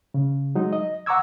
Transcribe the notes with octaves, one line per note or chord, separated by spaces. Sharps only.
C#3
F#3 G#3 D#4
D#5
F#5 A#5 C#6 D6 E6 G#6